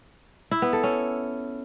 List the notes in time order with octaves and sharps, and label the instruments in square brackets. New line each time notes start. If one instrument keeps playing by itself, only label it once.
[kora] E4
B3
A4
C#4